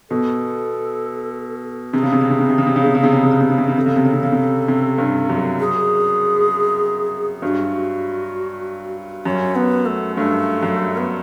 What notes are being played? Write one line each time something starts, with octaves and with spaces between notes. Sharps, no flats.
B2 A4
C3 G#4
C#3
C3
C#3
C3
C#3
C3
C#3
C3
C#3
C3
C#3
C3
C#3
C3
C#3
C3
C#3
C3
C#3
C3 A4
C#3
C3
C#3
C3
C#3
C3
C3
G2
F#2
G#4
G2 F#4
F#2 C#4
B3
A3
G2 A3
F#2
B3